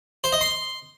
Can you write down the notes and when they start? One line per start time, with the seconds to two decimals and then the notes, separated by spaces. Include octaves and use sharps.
0.24 C5
0.32 D#5
0.41 C6